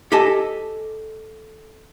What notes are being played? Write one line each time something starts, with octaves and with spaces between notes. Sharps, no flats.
G4 A4 D#5 G#5 A5